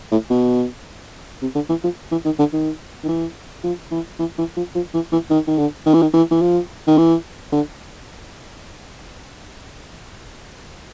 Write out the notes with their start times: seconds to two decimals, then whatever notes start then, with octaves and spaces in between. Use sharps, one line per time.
0.12 A2
0.30 B2
1.42 C3
1.55 D3
1.69 E3
1.84 F3
2.11 E3
2.25 D#3
2.39 D3
2.53 D#3
3.04 D#3
3.08 E3
3.64 F3
3.92 E3
4.19 E3
4.38 E3
4.57 F3
4.75 F3
4.94 E3
5.12 E3
5.31 D#3
5.48 D#3
5.58 D3
5.86 D#3
5.94 E3
6.02 D#3
6.14 E3
6.31 E3
6.42 F3
6.87 D#3
6.98 E3
7.52 D3